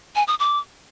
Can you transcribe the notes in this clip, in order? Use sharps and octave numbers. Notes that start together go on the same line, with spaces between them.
G#5
D#6
D6